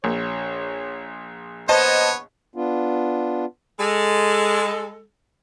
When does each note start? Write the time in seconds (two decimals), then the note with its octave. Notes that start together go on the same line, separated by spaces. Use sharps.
0.04 A#1 C#5
1.69 B3 C5 C#5 D#5 A5
2.55 B3 D4 F4
3.79 G#3 A4